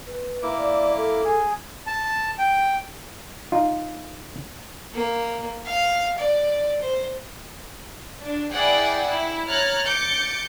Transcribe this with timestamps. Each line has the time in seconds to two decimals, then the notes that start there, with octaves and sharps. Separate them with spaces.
0.07 B4
0.43 A#3 E4 D6
0.58 D5
0.97 A4
1.24 G#4
1.87 A5
2.39 G5
3.52 D#4 F4
4.94 A#3
5.66 F5
6.18 D5
6.81 C5
8.22 D4
8.52 E4 G#4 D5 F#5 G5
9.09 E4
9.50 C#5 A#5 F6 F#6 G#6 A6
9.86 D6 G6 A6 C#7